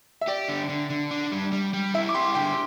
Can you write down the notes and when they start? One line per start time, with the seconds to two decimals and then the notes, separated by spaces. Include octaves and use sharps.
0.21 E5
0.27 G4 D5
0.48 D3
0.69 D3
0.90 D3
1.11 D4
1.32 G3
1.52 G3
1.74 G3
1.94 E4 E5
2.09 D6
2.15 G4 C6
2.35 D3 G5